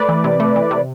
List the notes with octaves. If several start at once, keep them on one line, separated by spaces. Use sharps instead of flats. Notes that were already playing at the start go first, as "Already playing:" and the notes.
Already playing: A3 B4 D5
E3
C3
A3
E3
C3